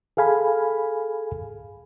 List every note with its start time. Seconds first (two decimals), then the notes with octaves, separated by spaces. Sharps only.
0.17 G#4 A4 F5 G#5 B5